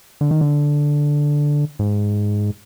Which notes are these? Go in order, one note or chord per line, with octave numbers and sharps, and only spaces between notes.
D3
D#3
D3
G#2